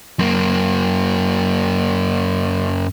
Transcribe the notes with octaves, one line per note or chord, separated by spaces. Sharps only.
F#2 A#3